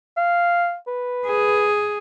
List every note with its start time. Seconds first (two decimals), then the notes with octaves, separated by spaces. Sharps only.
0.17 F5
0.87 B4
1.27 G#4